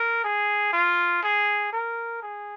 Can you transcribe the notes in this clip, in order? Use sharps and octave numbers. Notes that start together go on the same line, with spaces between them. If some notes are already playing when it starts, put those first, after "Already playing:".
Already playing: A#4
G#4
F4
G#4
A#4
G#4